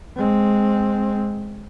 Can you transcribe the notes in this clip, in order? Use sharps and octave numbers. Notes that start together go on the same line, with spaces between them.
G#3 C4